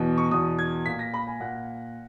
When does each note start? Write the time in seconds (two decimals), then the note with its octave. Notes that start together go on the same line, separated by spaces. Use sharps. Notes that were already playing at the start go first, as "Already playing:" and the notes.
Already playing: E2 B2
0.18 C#6
0.31 E2 B2 D#6
0.59 G#6
0.86 A#2 B6
0.99 A#6
1.14 B5
1.27 G#5
1.40 A#2 F#5